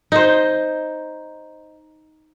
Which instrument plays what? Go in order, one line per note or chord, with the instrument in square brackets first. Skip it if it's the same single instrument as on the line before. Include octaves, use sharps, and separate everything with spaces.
[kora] D#4 C5